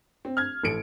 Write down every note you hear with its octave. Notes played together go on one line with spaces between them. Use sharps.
C4
F6 G#6
A1 A4 C#7 D7